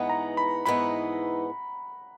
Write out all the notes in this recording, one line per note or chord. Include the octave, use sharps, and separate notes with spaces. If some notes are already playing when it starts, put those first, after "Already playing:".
Already playing: G#2 E3 B3 D#4 F#5
A#5
B5
G#2 E3 B3 D#4 B5